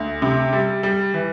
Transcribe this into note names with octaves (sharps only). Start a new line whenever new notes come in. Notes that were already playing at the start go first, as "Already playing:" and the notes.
Already playing: D2
C3
G3
G3
E3